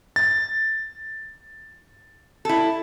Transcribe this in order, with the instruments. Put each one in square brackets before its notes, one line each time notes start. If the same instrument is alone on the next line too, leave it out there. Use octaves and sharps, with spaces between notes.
[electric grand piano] A6
[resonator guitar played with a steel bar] E4 A4